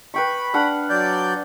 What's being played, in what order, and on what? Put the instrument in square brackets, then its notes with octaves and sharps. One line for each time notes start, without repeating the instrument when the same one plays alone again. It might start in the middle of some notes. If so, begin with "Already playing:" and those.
[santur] B4 G5 C#6 [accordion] B5
[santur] D4 F5 F#5
[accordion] F#3 D5 G6